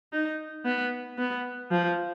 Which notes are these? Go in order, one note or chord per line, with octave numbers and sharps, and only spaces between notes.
D#4
B3
B3
F3